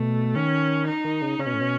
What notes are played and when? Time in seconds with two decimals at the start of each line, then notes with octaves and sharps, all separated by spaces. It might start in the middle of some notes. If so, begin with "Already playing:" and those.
Already playing: B2 A3
0.35 D#3 C#4
0.87 D#4
1.05 D#3
1.22 C#3
1.39 C#3 C#4
1.46 B2
1.54 A2
1.61 B2